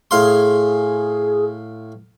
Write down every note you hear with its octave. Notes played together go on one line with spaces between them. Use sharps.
A2 G#4 F5 C6